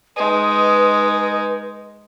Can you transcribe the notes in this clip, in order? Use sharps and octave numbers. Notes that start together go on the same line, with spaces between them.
G#3 D#4 B4 D#5